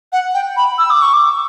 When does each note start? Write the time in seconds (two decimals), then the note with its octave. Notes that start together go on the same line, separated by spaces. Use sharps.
0.13 F#5
0.34 G5
0.57 B5
0.78 E6
0.90 D6
1.02 C#6
1.13 D6